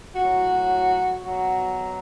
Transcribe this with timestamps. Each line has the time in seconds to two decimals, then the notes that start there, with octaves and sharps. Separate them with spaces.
0.16 A2 F#3 F#4
1.23 B2 F#3 F#4